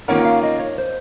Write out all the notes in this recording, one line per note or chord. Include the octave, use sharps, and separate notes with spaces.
D#3 A#3 C#4 F4 A#4 F#5
F5
D#5
C#5
C5